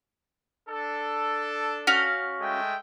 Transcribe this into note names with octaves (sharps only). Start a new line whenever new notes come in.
D4 A4
C#4 F#4 F5
G#3 A3 G5